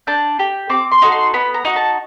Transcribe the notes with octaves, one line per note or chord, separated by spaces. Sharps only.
D4 G6
G4
C4 D6
C6
D#4 F#4 A4
C6
B3 B5
A#5
D#4 F#4
A5